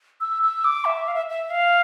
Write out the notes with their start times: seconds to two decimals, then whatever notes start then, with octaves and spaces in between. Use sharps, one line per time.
0.21 E6
0.43 E6
0.64 D6
0.85 E5
1.08 F5
1.14 E5
1.30 E5
1.50 F5